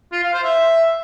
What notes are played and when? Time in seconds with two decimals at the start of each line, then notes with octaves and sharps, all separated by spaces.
0.13 F4
0.23 F5
0.33 C5
0.44 E5